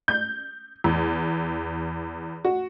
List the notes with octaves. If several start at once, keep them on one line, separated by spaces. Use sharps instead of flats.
G6
E2
F#4